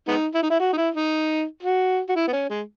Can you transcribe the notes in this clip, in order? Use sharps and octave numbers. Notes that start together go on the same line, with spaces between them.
G#3 B3 D#4
E4
D#4
E4
F#4
D#4
E4
D#4
F#4
F#4
E4
B3
C#4
G#3